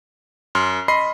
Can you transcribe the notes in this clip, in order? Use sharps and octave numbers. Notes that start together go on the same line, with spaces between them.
F#2 C6 F6
D#5 B5 C6 C7